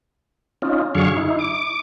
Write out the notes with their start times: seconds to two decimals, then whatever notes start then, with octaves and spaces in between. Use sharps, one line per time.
0.62 C#4 D#4 F4
0.95 F#2 D3 F#3 G#4 F5 C#6
1.17 D#4 E4
1.39 D6